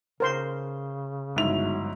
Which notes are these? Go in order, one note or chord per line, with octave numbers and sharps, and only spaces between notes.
C#3 A#4 C5 C6
G1 G#2 F#3 E4 F7